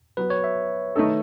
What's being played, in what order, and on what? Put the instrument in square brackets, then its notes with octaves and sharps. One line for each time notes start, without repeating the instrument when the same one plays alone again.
[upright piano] F#3 B3 F#4 [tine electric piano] B4
[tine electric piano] C#5
E5
[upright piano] D#3 A3 D#4 A4